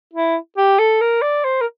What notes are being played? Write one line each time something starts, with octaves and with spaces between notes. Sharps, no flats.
E4
G4
A4
A#4
D5
C5
A#4